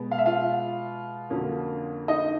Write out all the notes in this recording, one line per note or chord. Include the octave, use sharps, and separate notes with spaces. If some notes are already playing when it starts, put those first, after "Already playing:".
Already playing: B2 G#3 B3
F5
E5
F4 F5
F2 D3 F#3 A#3 C#4
D#4 D#5